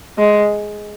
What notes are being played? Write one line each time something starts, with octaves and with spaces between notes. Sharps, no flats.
G#3